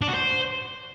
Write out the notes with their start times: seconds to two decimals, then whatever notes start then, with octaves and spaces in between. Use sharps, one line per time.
0.01 D4
0.08 F#4
0.14 C5